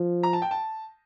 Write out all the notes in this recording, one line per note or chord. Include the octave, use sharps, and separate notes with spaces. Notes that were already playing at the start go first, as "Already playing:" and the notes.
Already playing: F3
A#5
A5
G5
A5